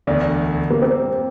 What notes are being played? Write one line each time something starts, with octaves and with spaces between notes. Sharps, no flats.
E1 D2 D3 A3 D4
A#3
C4